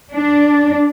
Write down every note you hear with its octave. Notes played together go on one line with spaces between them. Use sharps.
D4